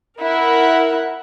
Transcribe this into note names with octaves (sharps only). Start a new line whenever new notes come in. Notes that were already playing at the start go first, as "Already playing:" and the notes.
E4 A#4 F#5